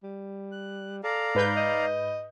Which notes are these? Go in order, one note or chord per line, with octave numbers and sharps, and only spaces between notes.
G3
F#6
A4 D5 F5 A#5
G#2 B4 G6
D#5